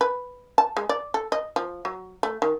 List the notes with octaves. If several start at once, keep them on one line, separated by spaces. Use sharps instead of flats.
B4
A5
G#3
D5
A4
D#5
F3
F#3
A3
D#3